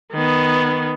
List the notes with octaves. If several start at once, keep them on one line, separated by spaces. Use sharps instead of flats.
D#3 B3